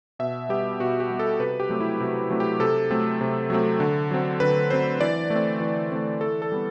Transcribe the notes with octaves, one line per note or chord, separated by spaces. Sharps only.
B2 E5
G3 B3 G4
B2 F#4
G4
G3 B3
A4
C3 B4
G4
F#3 A3 C4
E4
C3 F#4
F#3 A3 C4
G4
C3 A4
F#3 A3 C4
C3
F#3 A3 C4
D3
F#3 C4
D3 B4
F#3 C4 C5
E3 D5
A3
C4
E3
A3 C4
E3 A4
A4
G3 B3